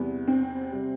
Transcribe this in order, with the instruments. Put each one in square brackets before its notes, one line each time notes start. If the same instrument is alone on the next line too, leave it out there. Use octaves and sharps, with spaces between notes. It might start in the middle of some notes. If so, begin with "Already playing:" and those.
Already playing: [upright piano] E2 C3 G3 B3
[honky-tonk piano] C4
[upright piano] C3 G3